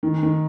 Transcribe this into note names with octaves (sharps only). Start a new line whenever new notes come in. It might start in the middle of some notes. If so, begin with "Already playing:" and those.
D#3
D#3